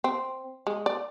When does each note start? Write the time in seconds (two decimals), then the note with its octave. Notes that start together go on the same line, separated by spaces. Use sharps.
0.04 C4
0.67 G#3
0.86 D5